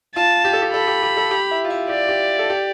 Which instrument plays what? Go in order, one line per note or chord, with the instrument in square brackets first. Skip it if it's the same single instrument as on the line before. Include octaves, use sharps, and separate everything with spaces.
[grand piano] F4 [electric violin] A5
[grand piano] G4
A4
G4
[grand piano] A4 [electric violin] B5
[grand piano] G4
G4
A4
G4
E4
F4
E4
[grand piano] G4 [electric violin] D5
[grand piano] G4
A4
G4